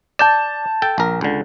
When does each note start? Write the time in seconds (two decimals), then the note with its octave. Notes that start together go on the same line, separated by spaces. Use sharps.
0.19 D5 A5 G6 E7
0.82 A4 G5
0.98 A#1 A#4
1.21 C#2 D3